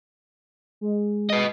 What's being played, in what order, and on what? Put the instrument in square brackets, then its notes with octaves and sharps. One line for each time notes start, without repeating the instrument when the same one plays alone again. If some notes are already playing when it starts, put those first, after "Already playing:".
[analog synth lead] G#3
[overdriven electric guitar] B4 D#5